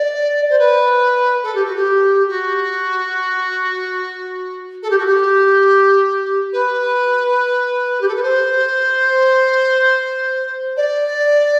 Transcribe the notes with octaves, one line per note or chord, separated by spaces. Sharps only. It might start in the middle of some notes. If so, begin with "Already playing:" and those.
Already playing: D5
C5
B4
A4
G4
F#4
G4
F#4
A4
G4
F#4
G4
B4
G4
A4
B4
C5
D5